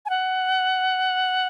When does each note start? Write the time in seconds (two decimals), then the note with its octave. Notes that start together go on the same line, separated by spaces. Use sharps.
0.05 G#5
0.10 F#5